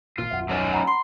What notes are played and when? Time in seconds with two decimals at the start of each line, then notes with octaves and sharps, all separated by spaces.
0.18 G#1 A#2 F4
0.30 D#1 B1 F#2 E5 F#5
0.49 F#3 C#4 D#4
0.73 F#5 A#5 B5
0.87 C6